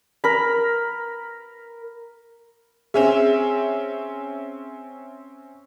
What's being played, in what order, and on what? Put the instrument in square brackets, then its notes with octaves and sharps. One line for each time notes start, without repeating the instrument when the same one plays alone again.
[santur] A#4 B5
[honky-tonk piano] C4 C#4 E5 [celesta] G#4